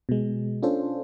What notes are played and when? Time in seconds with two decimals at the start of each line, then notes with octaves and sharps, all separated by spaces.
0.09 B2 G#3
0.63 C#4 D4 F4 A4 C5